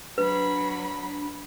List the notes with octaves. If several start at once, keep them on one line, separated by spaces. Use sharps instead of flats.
F#3 D4 B4 B5